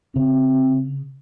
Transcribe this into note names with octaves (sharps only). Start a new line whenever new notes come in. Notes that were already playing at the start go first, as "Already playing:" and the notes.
C#3 C4